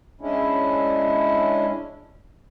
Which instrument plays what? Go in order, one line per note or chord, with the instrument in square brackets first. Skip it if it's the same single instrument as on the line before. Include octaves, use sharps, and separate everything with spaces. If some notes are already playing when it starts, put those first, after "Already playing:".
[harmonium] G#3 C#4 D4 E4